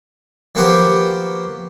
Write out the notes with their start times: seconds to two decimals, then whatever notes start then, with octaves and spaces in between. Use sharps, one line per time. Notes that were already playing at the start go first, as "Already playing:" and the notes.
0.55 F3 A#3 B3 F#4 G4 C5